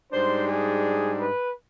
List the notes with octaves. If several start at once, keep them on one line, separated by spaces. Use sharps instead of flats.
G#2 G3 D4 C5
G#4
B4